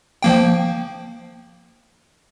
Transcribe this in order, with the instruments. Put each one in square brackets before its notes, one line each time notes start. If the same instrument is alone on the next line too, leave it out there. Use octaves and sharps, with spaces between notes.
[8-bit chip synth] F3 A#3 G5